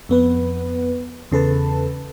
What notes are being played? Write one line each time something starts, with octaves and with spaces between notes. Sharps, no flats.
F2 B3 B4
E2 C#3 A4 B4 A5